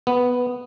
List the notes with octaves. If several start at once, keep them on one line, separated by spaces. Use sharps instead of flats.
B3